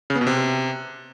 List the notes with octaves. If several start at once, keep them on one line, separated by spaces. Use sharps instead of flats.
C#3
B3
B2
C3